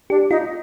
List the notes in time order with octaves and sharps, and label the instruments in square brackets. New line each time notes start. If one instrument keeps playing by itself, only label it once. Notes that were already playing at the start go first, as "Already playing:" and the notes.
[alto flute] D4 [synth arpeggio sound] G4
[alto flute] D#4 [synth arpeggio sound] F4